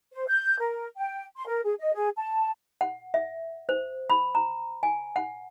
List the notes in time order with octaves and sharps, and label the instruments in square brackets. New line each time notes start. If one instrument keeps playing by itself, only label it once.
[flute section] C5
G6
A#4
G5
C6
A#4
G#4
D#5
G#4
A5
[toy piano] F#5
E5
C5
B5
A#5
G#5
F#5